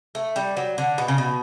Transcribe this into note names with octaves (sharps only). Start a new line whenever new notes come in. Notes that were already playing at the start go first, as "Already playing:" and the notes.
A3
G3
F#3
D3
B2
C#3
B2